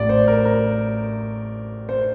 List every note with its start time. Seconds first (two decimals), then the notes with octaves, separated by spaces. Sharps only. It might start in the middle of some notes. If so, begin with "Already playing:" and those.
Already playing: A1 A2 D5
0.09 C5
0.28 A#4
0.45 A#4
1.89 C5